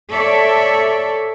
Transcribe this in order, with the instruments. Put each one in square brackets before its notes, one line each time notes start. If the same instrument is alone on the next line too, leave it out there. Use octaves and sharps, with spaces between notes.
[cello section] A4 C#5 D5 E5